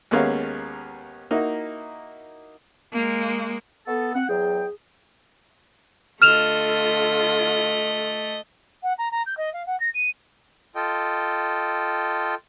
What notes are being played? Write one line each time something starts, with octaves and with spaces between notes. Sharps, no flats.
D#2 G#3 A#3 B3 C#4 F5
A#3 D#4 E4 F#4
G#3 A#3
B3 A4
C4 F#5
E2 F#3 G#4 G5
D3 A3 F4 D#5 F6 E7 F7
F#5
A#5
A#5
G6
D#5
F5
F#5
A#6
D#7
F4 A4 D#5 G5